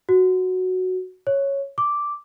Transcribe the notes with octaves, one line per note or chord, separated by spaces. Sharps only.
F#4
C#5
D6